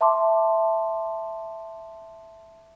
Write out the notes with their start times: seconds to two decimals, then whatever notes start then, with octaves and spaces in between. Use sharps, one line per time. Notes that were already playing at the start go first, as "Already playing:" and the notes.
0.01 E5 A5 C6 D6